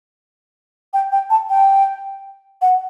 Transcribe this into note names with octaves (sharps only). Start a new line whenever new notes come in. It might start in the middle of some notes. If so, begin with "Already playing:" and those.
G5
G5
A5
G5
F#5